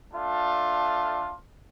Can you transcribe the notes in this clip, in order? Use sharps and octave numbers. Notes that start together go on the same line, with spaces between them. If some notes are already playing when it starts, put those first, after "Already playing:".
A3 D4 F4